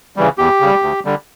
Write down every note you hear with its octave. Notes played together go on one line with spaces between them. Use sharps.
C#3 E3 G3
E2 G4
C#3 G3
D2
D3 G3